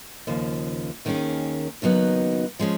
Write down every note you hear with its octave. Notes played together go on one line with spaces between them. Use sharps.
D#2 C#3 F3
D#2 D#3 A#3 C#4 G#4
D#2 C#3 F#3 B3 D#4
F3 G#3 C#4